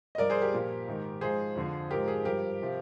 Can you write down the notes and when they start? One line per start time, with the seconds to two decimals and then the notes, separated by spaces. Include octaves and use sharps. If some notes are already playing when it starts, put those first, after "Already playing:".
0.15 D#5
0.18 G2 F3 A#4 D5
0.30 G#4 C5
0.42 G4 A#4
0.53 A#2 F3
0.87 G#2 D#3
1.21 G#2 F3 G#4 C5
1.56 F2 D3 F3
1.90 G#2 F3 G4 A#4
2.08 G#4
2.25 G2 F3 G4 A#4
2.62 C3 F3